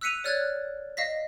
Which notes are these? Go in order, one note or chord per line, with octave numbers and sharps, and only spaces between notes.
E6 F#6 B6 C#7 D#7 F7
C#5 D5 F6 F#6 G#6 A6
D#5 F5 A#6 B6